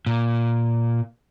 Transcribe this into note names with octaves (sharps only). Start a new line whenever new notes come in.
A#2